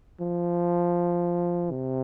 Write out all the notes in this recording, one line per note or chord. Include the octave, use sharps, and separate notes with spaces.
F3
C3